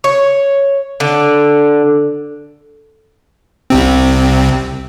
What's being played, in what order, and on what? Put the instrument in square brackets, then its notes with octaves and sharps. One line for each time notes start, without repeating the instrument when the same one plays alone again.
[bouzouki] C#5
D3
[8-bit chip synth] C2 C3 C4